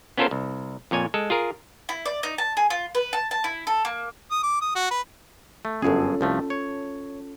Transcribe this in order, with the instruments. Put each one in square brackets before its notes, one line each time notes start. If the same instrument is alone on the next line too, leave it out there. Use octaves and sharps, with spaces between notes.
[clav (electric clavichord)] B3 C#4 F4 A4 A#4 C5
C2
F2 A#2 C#5 G#5
G#3 A4
F4 G#4 A#4
[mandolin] E4
D5
D#4
A5
G#4
F4
B4
A5
A5
E4
A4
A#3
[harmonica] D#6
D6
D#6
F#4
B4
[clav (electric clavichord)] A3
[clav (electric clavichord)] G1 F#2 G#4 [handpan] C#4 F4 A4
[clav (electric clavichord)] C2 F3 A3
C#5